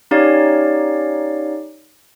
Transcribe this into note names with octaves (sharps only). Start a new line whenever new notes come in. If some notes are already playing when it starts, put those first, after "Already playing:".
C#4 D#4 G4 C#5 D5 F5